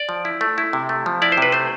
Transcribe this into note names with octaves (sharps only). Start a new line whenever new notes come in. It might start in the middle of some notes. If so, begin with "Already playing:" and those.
Already playing: D5
F3
E4
A3
E4
C3
A3
F3
E4 D5
C5
C3 B4
A3 C5